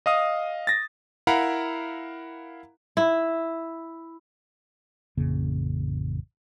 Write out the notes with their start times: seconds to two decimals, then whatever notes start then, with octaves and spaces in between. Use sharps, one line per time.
0.06 D#5 F5 D#6
0.67 A6 A#6
1.27 E4 A#4 F5 F#5 A#5 B5
2.97 E4
5.17 A1 F2 C#3 A#3